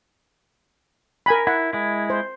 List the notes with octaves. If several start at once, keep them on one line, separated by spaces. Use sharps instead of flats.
A#4 G#5 B5
E4 F#5
G#3 E4
C5